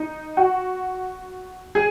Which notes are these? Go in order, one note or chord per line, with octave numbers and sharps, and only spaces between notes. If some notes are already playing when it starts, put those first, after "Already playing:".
Already playing: D#4
F#4
G#4